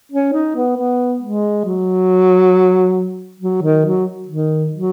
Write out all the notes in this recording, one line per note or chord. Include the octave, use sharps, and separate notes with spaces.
C#4
D#4
B3
B3
G#3
F#3
F#3
D#3
F#3
D#3
F#3